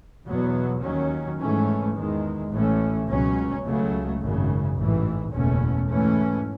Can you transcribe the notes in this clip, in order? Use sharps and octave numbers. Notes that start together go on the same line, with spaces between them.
E2 B2 F#3 B3
D#2 D#3 F#3 C#4
G#2 E3 A3 C#4
E2 D#3 G#3
A1 A2 E3 A3 C#4
C#2 B2 F#3 C#4
C#2 C#3 F#3 A3
G#1 F#2 C#3
A1 G#2 E3
F#1 E2 B2 A3 C#4
G#2 E3 A3 C#4